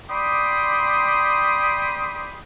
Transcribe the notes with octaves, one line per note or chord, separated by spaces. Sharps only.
D5 G5 B5 C6 D6 D#6